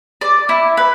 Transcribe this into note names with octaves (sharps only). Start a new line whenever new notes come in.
D5
E4
B4